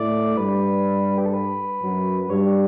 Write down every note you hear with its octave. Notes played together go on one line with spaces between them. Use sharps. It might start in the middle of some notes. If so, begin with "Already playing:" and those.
Already playing: A2 A3 D5
G2 G3 B4
G4
A4
B4
F#2 F#3
B4
G2 G3 C#5